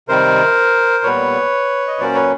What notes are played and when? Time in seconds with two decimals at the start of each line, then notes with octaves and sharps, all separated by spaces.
0.08 C3 D#3 G3 C4 A#4 C5
1.04 A#2 G3 B3 B4 C#5
1.87 D#5
1.99 A#2 F#3 A#3 C#4 C5 D5
2.15 B4 C#5